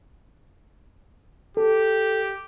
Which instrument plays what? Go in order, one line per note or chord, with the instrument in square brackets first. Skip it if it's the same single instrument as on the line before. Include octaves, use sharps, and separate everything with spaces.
[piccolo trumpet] G4 [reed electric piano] A4